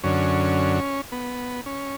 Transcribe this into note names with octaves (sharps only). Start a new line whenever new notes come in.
F#2 D3 C#4
B3
C#4